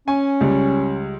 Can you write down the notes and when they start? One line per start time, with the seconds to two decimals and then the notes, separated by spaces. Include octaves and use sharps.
0.08 C#4 G#5
0.41 C#2 G3